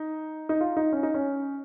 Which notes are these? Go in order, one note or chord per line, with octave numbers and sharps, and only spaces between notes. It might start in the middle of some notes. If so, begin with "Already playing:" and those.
Already playing: D#4
D#4
F4
D#4
C#4
D#4
C#4